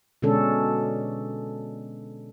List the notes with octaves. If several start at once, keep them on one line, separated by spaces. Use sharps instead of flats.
B2 D3 G#3 C#4 D4 A4